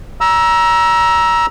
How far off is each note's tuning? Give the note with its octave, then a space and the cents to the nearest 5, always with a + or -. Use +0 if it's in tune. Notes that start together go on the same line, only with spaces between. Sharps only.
A#5 +25 E6 +0